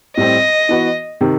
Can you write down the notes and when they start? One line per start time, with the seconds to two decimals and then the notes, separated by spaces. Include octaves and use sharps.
0.17 A2 G3 C4 D#5
0.69 E3 B3 F#4
1.21 C3 D#3